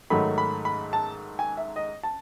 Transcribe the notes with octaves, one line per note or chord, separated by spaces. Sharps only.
G#2 D#3 F#3 A3 B5
B5
B5
A5
G#5
E5
D#5
A5